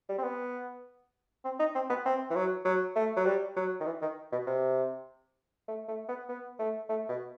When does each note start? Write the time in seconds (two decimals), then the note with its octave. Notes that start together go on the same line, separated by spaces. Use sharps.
0.09 G3
0.18 C4
0.23 B3
1.45 C4
1.59 D#4
1.75 C4
1.90 B3
2.05 C4
2.30 E3
2.36 F#3
2.65 F#3
2.96 A3
3.17 F#3
3.26 G3
3.56 F#3
3.80 D#3
3.86 E3
4.02 D#3
4.32 B2
4.47 C3
5.68 A3
5.88 A3
6.09 B3
6.29 B3
6.59 A3
6.89 A3
7.09 B2